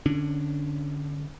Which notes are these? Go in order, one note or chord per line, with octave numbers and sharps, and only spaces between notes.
D3 C#4 D4